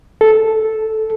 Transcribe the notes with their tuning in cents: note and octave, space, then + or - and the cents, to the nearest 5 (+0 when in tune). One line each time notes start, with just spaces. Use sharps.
A4 -5